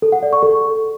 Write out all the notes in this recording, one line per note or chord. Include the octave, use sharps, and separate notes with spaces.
A4
F#5
D5
C#6
A4